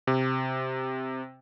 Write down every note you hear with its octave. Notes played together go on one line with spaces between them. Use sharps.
C3